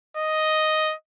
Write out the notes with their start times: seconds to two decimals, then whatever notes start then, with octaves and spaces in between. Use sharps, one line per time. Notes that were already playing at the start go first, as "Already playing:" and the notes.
0.17 D#5